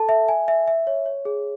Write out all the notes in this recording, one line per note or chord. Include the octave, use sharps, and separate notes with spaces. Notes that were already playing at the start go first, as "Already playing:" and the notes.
Already playing: A4 A5
E5
G#5
E5
E5
C#5
C#5
G#4